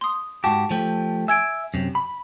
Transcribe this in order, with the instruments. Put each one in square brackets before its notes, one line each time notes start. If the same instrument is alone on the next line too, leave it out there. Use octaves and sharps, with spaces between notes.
[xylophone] C6 D#6
[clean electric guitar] G#2 F#4 G4 [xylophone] A5
[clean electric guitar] F3 A3 G4
[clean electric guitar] E5 [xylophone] G#5 G#6 D7
[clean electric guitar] F#2 C3
B5